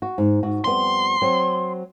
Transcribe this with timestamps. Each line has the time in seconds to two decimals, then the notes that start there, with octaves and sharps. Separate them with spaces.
0.02 F#4
0.18 G#2
0.43 G#2 F#4
0.64 F2 G3 B3 C6
1.22 F#3 C4